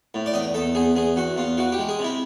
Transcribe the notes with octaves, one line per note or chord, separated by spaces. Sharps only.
A2
D5
E2 D#5
E2 A4
E2 G#4
E2 G#4
E2 F#4
E2 F4
E3 F#4
G4
G#3
G#4
C3 E4